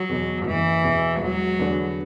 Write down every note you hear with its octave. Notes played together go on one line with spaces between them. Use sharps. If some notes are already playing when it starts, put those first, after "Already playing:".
Already playing: F#3
E2 B2
F#1 E3
E2 B2
E1 F#3
E2 D3 B3 D4